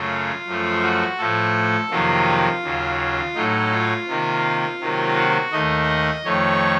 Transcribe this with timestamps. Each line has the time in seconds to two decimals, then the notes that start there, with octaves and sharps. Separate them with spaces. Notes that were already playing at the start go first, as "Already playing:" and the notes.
Already playing: F#2 C#3 F#3 A3 F4
0.46 F#2 F3 A3
0.82 F#4
1.19 A2 F3 A3 A4
1.91 F2 C3 D#3 F#3 A#3 F4
2.63 D#2 C#3 F#3
3.35 A2 F#3 A3 D#4
3.71 F4
4.07 C3 D#3 A#3
4.80 C3 D#3 F#3 A#3
5.16 F#4
5.52 D#2 D#3 A3 D#5
6.24 F2 D#3 A3 C#5